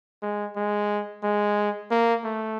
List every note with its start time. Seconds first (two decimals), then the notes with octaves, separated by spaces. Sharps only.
0.22 G#3
0.56 G#3
1.23 G#3
1.91 A#3
2.24 A3